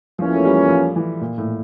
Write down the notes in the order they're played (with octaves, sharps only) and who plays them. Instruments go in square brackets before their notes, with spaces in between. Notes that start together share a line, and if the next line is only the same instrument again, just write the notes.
[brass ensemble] E2 E3 A#3 C#4 F4 [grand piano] F3
[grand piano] A3
G3
F3
E3
A#2
A2